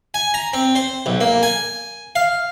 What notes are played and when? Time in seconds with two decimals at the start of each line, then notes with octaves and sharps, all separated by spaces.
0.14 G#5
0.34 A#5
0.53 C4
0.75 C5
1.06 B1
1.21 A#3
1.43 G#5
2.15 F5